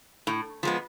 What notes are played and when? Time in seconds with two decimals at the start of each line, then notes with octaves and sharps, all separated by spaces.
0.27 A2
0.63 F3 G#3 B3